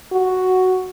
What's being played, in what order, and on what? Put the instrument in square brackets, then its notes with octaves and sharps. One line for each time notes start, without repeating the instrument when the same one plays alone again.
[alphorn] F#4